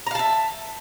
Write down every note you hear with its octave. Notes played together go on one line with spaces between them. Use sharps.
E5 F5 A5 A#5